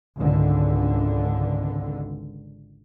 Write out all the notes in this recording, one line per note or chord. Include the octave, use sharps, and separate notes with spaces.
G#1 C#2 D3